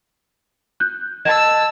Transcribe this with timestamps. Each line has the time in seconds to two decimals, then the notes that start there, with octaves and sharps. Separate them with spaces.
0.80 F#6 G6
1.25 D#5 A5 E6 G#6 E7